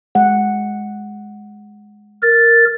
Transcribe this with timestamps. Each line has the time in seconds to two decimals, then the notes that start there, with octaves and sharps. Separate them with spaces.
0.15 G#3 F#5
2.22 A#4 A6